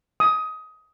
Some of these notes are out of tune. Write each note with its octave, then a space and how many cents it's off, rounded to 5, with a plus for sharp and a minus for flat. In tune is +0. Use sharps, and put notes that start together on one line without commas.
D#6 +20